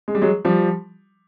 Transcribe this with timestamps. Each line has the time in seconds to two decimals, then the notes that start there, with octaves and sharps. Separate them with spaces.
0.08 G#3
0.15 G3
0.22 F#3 G#3
0.45 F3 G3